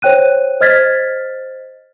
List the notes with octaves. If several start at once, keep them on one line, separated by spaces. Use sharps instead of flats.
C5 C#5 G5 F#6 D#7
C5 D#5 F6 G#6 A6 B6